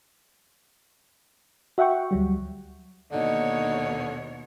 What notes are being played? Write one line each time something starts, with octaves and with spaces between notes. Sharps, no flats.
F#4 E5 F#5 G5 C#6
D2 F#3 G3
D#2 B2 D3 D#4 C#5